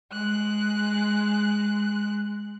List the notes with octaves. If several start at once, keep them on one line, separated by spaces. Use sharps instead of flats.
G#3 F#6